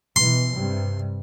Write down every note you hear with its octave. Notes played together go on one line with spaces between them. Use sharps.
B2 E3 C6
G2 C3 G3